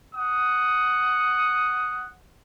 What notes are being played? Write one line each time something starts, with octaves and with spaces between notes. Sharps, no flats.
F#5 D#6